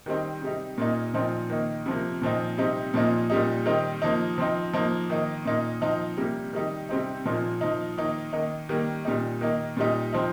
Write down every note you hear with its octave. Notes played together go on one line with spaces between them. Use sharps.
D#3 G3 C4 D#4
C3 G3 D#4
A#2 A#3 D#4
A#2 F3 C4 D#4
D#3 A#3 D#4
C3 F3 A#3
A#2 F3 C4 D#4
C3 G3 C4 D#4
A#2 F3 A#3 D#4
A#2 G3 D#4
D#3 G3 C4 D#4
F3 A#3 D#4
F3 C4 D#4
F3 A#3 D#4
D#3 A#3 D#4
A#2 A#3 D#4
F3 C4 D#4
C3 G3 A#3
D#3 G3 D#4
C3 G3 C4 D#4
A#2 F3 A#3 D#4
F3 D#4
D#3 A#3 D#4
D#3 A#3 D#4
D#3 G3 A#3
A#2 G3 D#4
D#3 A#3 D#4
A#2 G3 D#4
F3 C4 D#4